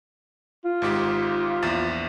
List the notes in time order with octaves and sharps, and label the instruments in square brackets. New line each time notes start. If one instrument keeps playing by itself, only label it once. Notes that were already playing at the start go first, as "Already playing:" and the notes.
[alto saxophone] F4
[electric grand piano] G#1 G#2 G4
A#1 E2 A6